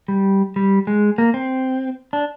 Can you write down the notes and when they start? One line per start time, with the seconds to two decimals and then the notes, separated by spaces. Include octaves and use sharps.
0.08 G3
0.56 G3
0.87 G#3
1.18 A#3
1.34 C4
2.13 D4